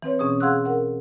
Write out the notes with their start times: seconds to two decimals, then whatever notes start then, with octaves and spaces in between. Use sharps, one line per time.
0.02 E3 C4 B4 C#5
0.19 B2 C#4 G#4 D#6
0.40 G#4 F5 F#5 C6 E6 F#6
0.65 A#4 F#5